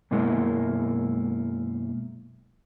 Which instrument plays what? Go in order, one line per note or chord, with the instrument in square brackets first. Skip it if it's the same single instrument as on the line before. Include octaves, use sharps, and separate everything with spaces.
[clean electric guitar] F#2 B2 G#3 A#3 E4